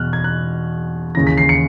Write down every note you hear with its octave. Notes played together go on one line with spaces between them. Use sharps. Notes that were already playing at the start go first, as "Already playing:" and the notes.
Already playing: E2 B2 F6 F#6
G#6
F#6
D#2 C#3 E3 A#6
B6
C7
C#7